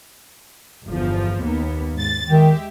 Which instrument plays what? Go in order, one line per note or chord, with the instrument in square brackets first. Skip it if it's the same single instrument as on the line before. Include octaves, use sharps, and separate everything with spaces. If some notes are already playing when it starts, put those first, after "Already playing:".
[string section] G1 E2 F3
D#2 A#3 B3
G#2 A6
[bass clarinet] D#3 [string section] G#3 G4 E5